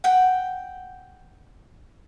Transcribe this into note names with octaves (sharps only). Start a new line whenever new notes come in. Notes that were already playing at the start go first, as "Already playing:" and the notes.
F#5 G5